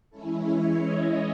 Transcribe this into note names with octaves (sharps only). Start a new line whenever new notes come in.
E3 G#3 C#4 E4 A4
C#5
D#5